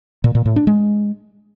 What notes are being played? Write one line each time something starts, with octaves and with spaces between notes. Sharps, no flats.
A#2
A#2
A2
D4
G#3